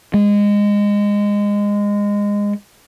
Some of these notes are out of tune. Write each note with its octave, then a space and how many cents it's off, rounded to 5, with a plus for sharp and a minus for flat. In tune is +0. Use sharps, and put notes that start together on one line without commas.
G#3 -20